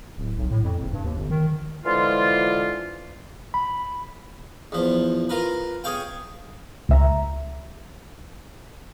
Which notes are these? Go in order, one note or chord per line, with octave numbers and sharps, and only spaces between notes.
D1
B1
A2
F2
F#1
G2
D#2
G1
D#3
D3 E3 F3 G#3 F4
B5
E2 F3
F4 A#4 B4
G#4 C#5 F5 G5
C#2 E5 A#5